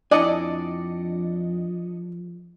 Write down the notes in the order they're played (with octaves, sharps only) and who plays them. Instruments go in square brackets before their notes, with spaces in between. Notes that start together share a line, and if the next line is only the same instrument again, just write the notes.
[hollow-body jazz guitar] F2 E4 G#5 [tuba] F3 [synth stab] D4 D#5 C#7 [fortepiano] D5